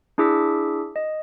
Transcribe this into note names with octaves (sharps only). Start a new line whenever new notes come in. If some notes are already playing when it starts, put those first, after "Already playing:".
D4 E4 G#4 D6 E6 B6
D#5